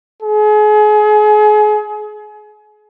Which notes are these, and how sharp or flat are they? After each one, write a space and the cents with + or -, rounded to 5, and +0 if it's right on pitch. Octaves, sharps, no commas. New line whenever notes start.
G#4 +35